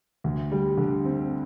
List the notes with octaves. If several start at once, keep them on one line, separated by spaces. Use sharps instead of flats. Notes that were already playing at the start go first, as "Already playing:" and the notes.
D2
G3
D3
C4